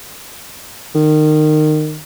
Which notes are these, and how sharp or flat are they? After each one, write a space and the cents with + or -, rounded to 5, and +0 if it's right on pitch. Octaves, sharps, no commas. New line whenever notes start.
D#3 -20